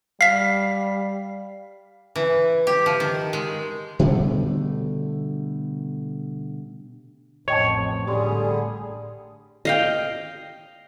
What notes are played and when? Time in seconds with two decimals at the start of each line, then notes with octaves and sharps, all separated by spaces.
0.21 G3 F5 B6 C7
2.16 E3
2.67 G4
2.86 F3
3.00 D#3
3.33 G#3
3.99 B2 D3 G3 A3
7.48 A1 F2 C#5 D#5 G5 A5
8.07 A2 D3 G3 G4 G#4 D5 C6
9.65 D#5 F5 G5